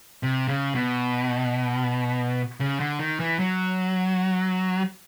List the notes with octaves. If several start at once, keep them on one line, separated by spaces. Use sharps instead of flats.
C3
C#3
B2
C#3
D3
D#3
E3
F#3